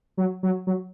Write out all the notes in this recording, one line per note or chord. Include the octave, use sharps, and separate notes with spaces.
F#3
F#3
F#3